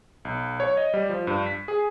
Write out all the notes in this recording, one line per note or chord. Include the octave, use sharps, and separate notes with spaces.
B1
C#5
D#5
G3
F3
G2
B6
G#4